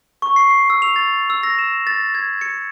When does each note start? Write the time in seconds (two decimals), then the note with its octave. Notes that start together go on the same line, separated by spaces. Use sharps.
0.22 C#6
0.36 C7
0.51 C7
0.70 E6
0.82 F7
0.96 A6
1.30 E6
1.43 A#6
1.59 E7
1.87 A6
2.15 G#6
2.41 C#7